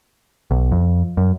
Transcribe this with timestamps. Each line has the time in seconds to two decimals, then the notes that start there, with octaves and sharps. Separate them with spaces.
0.51 B1
0.72 F2
1.17 F#2